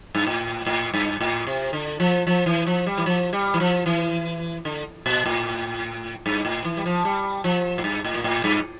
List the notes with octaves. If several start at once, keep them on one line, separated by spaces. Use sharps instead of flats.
G2
A2
A2
G2
A2
C3
D3
F3
F3
E3
F3
G3
E3
F3
G3
E3
F3
E3
D3
A#2
A2
G2
A2
E3
G3
F3
G3
F3
A2
G2
A2
A#2
A2
G2